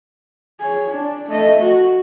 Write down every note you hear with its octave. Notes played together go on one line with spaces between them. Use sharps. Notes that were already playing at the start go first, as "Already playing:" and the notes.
G#4 C#5
D4
A3 D#5
F#4